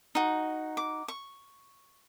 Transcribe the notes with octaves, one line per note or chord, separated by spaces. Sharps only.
D#4 F#4
D6
C#6